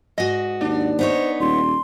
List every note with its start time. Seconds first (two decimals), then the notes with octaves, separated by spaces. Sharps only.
0.18 G#2 F#4 D#5
0.61 D#2 D4
0.99 B3 D#4 C5 C#5
1.40 D#1 C6